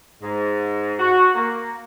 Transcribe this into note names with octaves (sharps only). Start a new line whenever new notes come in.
G#2
F#4
A#3